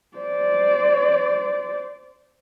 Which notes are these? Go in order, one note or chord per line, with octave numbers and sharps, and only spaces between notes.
C5 D5